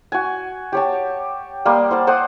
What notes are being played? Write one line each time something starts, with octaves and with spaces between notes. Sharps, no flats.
F#4 G#5
G4 C#5 A5
G3 A#3 C6 D#6
C5 F#5 A5
C5 D5 F#5 D#6